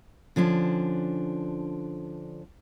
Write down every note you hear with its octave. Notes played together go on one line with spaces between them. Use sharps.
D3 F3 C#4 D4